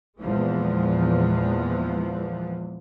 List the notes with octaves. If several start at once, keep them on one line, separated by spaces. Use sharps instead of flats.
E2 A#2 E3 F3 G#3